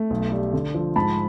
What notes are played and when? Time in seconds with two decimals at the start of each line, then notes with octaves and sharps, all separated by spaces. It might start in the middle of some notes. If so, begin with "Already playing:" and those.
Already playing: A3
0.10 B1
0.32 G3
0.53 D3
0.74 F3
0.96 G#2 A5 B5